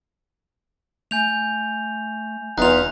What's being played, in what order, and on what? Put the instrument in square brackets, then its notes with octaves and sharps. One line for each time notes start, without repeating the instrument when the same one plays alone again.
[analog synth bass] A3 [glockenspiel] G#5 G6 F7
[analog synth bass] E1 [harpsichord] E2 [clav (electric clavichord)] D#4 F4 [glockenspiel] F#6 F7